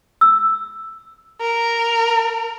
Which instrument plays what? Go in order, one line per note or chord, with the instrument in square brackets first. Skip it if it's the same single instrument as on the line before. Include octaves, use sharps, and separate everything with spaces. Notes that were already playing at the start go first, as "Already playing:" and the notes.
[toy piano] E6
[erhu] A#4